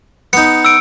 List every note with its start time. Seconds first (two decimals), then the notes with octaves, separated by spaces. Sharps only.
0.33 B3 D#4 C#7
0.65 E6 D7